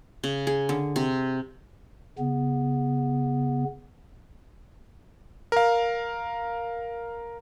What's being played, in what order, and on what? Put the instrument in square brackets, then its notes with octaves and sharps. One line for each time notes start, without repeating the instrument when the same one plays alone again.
[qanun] C#3
G#4
D3
C3
[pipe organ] C#3 B3
[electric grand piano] A#4 F5